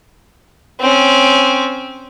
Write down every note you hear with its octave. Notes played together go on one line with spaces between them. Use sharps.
C4 C#4